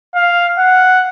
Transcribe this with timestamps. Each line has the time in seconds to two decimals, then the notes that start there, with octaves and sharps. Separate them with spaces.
0.15 F5
0.58 F#5